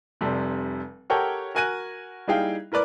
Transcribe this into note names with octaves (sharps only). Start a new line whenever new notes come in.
F1 C3 G3 A4
G4 A4 A#4 C#5 F#5 G5
F#4 A#4 G#5 F#6 A#6 D#7
G3 D#4 E4 G#4 F5 G5
E4 A#4 B4 D5